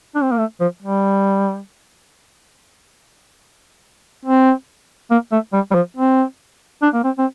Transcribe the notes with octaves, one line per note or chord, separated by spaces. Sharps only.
D4
C4
A#3
A3
F3
G3
C4
A#3
A3
G3
G3
F3
C4
D4
A#3
C4
C4